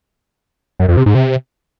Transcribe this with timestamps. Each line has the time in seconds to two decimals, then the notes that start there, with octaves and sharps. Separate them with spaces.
0.80 F#2
0.88 F2
0.97 C3
1.06 G#2
1.15 C3